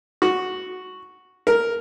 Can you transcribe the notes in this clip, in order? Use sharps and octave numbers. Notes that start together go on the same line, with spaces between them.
F#4
A#4